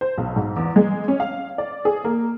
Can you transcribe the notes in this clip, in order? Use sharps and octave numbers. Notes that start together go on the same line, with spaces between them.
C5
B1
G#2
E2
G#3
C#4
F5
D5
G#4
A#3